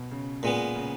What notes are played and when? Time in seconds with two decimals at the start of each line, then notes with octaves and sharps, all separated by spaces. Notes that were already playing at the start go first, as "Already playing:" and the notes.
Already playing: B2
0.11 C#3
0.43 A#2 G#3 B3
0.75 C#3